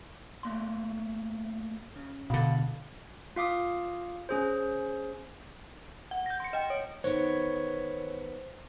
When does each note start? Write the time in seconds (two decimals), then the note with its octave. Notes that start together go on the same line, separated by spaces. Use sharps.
0.43 A3 A#3 C6
1.96 C#3
2.30 B2 D3 F5 B5
3.36 F4 F5 D6 D#6
4.29 C#4 G#4 C5
6.11 F#5
6.26 G6 A#6
6.40 C6 C#7
6.53 D#5 G5
6.70 C#5
7.04 D#3 B3 C5 C#5